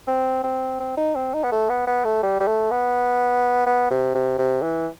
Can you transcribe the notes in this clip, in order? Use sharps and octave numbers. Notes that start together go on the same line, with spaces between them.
C4
C4
C4
D#4
C4
D#4
B3
A3
B3
B3
A3
G3
G3
A3
B3
B3
C3
C3
C3
E3